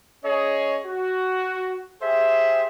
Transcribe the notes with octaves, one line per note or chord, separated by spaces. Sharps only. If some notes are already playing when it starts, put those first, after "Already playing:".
C#4 G#4 C#5 D#5
F#4
G4 G#4 C5 E5